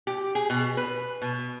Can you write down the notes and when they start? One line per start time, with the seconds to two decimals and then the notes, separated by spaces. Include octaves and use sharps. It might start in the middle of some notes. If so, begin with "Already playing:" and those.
0.07 G4
0.35 G#4
0.50 B2
0.77 B4
1.22 B2